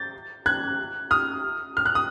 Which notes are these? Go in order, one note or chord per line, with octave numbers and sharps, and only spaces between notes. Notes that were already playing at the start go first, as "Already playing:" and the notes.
Already playing: G6 A6
F#6 G#6
D#6 F6
F6
F#6
D#6